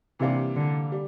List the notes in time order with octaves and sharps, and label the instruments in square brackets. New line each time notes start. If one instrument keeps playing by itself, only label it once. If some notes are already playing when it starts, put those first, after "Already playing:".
[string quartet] C3 [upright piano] E3 G3 A#3 D4
[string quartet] D3
[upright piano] G3